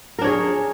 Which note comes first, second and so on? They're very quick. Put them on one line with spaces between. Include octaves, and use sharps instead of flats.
A#4 D4 C#5 G#4